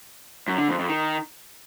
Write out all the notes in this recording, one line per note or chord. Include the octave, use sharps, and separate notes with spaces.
F#2
D3
F2
F2
D#3